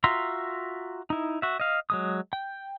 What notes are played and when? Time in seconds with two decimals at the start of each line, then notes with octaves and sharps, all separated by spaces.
0.04 F4 F#4 E5 A#5 C6
1.10 D#4 E4
1.42 F#4 E5
1.60 D#5 F5
1.90 F#3 G#3 D#6
2.33 G5